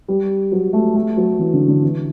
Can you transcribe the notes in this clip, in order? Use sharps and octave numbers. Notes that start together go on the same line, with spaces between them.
G3
F#3
A3
A3
F#3
E3
D3
D3
E3